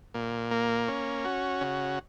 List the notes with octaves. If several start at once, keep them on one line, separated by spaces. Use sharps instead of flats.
A#2
A#3
C#4
F#4
C#3